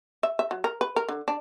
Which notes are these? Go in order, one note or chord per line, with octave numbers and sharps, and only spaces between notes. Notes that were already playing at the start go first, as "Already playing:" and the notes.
E5
E5
F#3
A#4
B4
A#4
D3
D4